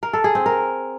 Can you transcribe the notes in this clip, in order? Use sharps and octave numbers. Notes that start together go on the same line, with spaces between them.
A#4
A4
G#4
C4
A#4